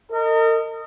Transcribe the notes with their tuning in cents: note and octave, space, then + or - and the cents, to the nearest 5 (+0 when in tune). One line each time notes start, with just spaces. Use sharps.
A#4 -40 D#5 +0